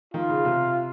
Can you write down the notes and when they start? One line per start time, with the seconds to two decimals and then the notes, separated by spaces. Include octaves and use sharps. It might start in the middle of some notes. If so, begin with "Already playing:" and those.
0.14 D#3 F4
0.29 C#3
0.45 C3